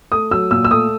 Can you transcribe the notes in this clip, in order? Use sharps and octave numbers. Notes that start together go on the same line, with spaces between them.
A3 D#6
F#3 E6
A#2 E6
E6
A3 D#6